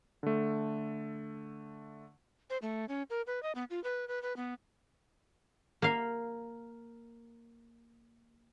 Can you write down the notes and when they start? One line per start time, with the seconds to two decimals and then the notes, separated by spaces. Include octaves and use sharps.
0.23 D3 A3
2.50 C5
2.62 A3
2.89 C#4
3.10 A#4
3.27 B4
3.43 D#5
3.55 B3
3.70 F4
3.84 B4
4.08 B4
4.22 B4
4.37 B3
5.82 A#3 F5